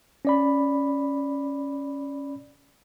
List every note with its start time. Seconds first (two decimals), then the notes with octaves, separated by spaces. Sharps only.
0.25 C#4 D5 B5